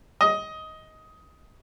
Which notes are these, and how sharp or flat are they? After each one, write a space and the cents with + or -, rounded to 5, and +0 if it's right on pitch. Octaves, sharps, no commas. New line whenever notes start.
D#5 +15